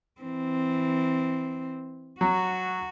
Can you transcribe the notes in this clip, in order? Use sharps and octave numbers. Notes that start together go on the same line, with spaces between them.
E3 C4
F#3 F#4